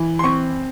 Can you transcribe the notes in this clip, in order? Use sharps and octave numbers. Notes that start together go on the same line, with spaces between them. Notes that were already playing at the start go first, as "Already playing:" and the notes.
Already playing: E3
C6
C4 C#6